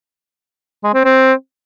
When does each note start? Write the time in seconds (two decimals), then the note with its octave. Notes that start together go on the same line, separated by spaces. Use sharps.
0.84 G#3
0.94 C4
1.04 C4